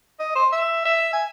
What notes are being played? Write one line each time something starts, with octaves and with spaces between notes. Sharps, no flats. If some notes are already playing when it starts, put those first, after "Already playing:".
D#5
C5
E5
E5
G#5